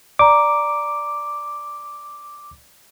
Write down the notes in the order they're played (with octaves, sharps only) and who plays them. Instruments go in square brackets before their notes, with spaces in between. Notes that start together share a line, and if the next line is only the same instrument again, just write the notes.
[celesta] D5 A#5 [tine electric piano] D6